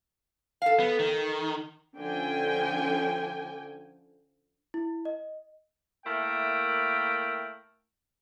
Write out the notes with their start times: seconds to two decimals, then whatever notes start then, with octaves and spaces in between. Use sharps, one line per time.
0.62 A4 F5
0.80 B3
0.99 D#3
1.97 D3 F3 C#4 G5 G#5
4.74 E4
5.05 D#5
6.05 A3 A#3 E4 A#4 G5